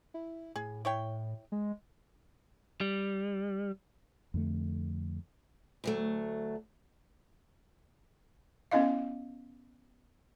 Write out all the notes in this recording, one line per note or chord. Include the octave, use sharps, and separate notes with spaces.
E4
A2 G#4
E4 C#5 G5
G#3
G3
F2 D3 A3
D2 F#3 A3
B3 C#4 E4 D#5 F5